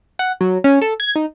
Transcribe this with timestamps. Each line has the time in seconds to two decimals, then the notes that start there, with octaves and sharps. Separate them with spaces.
0.19 F#5
0.41 F#3
0.64 C#4
0.82 A4
1.00 G#6
1.16 D#4